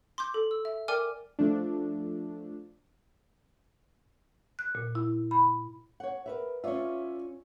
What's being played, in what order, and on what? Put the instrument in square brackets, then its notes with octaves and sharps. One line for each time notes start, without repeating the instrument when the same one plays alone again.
[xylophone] C6 D6 G6
A4
E6
E5
A#4 D5 G5 G#5 D6 F6
[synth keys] F3 A3 D4
[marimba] F#6
A#2
E4
B5
[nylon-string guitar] C#5 F#5
A#4 B4 E5
[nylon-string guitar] C#4 F4 [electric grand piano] C#5 D5 E5